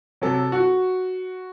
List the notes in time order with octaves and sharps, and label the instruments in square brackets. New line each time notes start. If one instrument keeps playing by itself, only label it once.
[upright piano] C3 F#3 A4
F#4